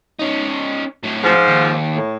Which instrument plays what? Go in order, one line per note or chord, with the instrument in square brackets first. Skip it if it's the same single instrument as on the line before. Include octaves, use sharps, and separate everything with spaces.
[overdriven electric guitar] C#4 D#4
A2 F#3
[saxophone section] G#2 F3
[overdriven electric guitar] D#2
[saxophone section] A2